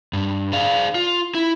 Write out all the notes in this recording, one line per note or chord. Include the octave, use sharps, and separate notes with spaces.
G2
G#4 D5 F5
F4
E4